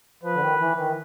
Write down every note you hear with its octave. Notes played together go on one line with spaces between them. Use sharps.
F3 B4
D3
D#3
E3
D#3